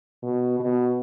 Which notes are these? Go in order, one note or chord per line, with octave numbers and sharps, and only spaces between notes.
B2
B2